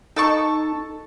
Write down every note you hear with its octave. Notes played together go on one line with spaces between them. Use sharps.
D#4 A4 A5 C#6